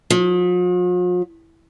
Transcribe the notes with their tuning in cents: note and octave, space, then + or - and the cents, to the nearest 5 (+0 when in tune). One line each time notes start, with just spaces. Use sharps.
F3 +45